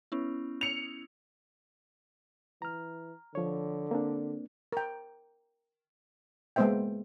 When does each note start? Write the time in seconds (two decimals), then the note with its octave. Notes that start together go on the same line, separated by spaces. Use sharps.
0.12 B3 C#4 E4
0.61 C#7 F7
2.62 E3 A#5 F6
3.35 D3 F3 C#5
3.91 A#3 C4 D4
4.72 A#4 G5
6.56 G#3 A#3 B3 C5 E5 G5